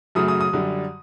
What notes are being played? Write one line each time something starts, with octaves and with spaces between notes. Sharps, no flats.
F#2 C#3 F#3 A3 D#6
D#6
D#6
F#2 D3 G3